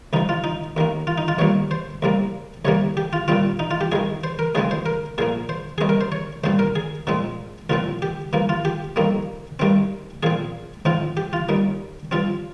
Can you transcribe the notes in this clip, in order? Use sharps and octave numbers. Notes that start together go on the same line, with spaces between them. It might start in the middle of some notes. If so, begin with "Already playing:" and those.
C2 C3 F3 D#4
F4
D#4
D#2 D#3 A#3
F4
D#4
F4
D#2 D#3 G3 A#3 C#5
C5
C2 C3 G3 A#3
C2 C3 G3 A#3 C#5
G4
F4
A#2 G3 C4 F4
D#4
F4
G4
C2 C3 D#3 G#4
C5
A#4
D#2 C#3 F3 G#3 C4 G#4
C5
A#4
A#2 F3 A#3 G#4
C5
D#2 D#3 G3 C4 G#4
A#4
C5
C#5
C2 A#2 G3 C4 C5
A#4
G#4
A#2 F3 G#3 C4
C2 A#2 F3 C4 F4
G4
G2 F3 A#3
F4
G4
F2 D#3 G3 A#3
G2 D#3 G3 C4
A#2 F3 C4 G#4
G#2 F3 C4 F4
G4
F4
D#2 D#3 G3
G2 F3 C4 F4